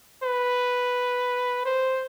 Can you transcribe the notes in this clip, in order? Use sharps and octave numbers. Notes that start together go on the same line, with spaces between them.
B4
C5